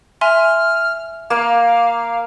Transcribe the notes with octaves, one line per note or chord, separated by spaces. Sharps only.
E5 G#5 C6 F6
A#3 F5